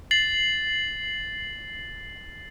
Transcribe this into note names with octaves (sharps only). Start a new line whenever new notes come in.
A6 C7 F#7